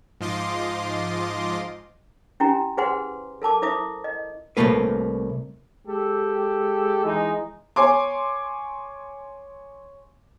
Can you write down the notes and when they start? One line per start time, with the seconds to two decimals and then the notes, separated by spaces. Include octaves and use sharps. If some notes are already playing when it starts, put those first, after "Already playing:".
0.21 G#2 F3 F4 D#5 C6 D6
2.40 C#4 E4 G4 G#5 A#5
2.77 G#4 B4 C5 F#5 G#5 C6
3.42 A4 A#4 A5 D6
3.62 E4 C5 E5 D6 D#6
4.04 D#5
4.57 C2 A#2 A3 A#3 B4
5.87 G#3 G4 A4
7.04 E3 G#3 D#4
7.76 C#5 G#5 C6 D6